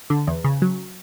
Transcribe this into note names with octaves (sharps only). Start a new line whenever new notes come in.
D3
E2
C#3
F#3